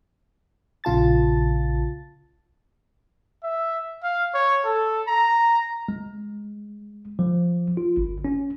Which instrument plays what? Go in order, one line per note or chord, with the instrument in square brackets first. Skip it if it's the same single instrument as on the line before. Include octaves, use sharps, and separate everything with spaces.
[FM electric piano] A#1 C#3 F4 A5 A6
[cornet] E5
F5
C#5
A4
A#5
[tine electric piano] G#3
F3
F4
G1
C#4